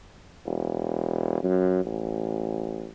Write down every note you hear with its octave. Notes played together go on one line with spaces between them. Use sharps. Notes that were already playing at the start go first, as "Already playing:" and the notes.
E1
F#2
A1